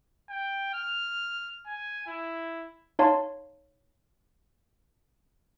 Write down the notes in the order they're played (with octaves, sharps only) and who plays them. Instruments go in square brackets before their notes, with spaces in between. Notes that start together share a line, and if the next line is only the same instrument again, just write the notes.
[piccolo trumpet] G5
F6
G#5
E4
[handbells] D#4 C#5 F5 A5 C6